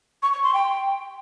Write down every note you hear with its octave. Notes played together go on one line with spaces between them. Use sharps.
C#6
C#6
C6
G5